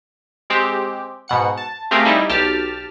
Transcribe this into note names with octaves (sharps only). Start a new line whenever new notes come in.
G#3 C4 G4
G#2 B2 F#5 C#7
A5
A3 C4 G4 G#4 A#4 F5
G3 D#4 E4 D#5
B1 G4 A5 F6